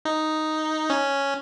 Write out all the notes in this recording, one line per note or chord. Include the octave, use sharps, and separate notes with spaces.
D#4
C#4